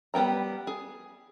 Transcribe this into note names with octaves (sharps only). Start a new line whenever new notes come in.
G3 B3 G5 A#5
G#4